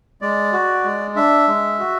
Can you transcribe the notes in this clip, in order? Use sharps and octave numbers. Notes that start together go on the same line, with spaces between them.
G#3 D5
F#4
G#3
D4 E5
G#3
F#4